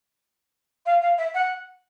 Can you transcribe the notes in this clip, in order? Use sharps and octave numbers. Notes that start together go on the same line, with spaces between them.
F5
F5
E5
F#5